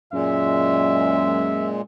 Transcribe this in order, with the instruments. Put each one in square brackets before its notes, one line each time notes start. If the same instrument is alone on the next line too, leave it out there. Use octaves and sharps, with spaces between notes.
[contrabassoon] F#2 [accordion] A#2 G#3 [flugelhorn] E5